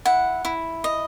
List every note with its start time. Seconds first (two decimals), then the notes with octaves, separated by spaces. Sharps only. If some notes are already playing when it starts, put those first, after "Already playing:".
0.05 E4 F#5
0.45 E4
0.84 D#5